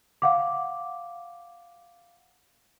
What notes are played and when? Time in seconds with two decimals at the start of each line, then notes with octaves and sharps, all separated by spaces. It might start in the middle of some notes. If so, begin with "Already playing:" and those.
0.22 F5 F#5 D6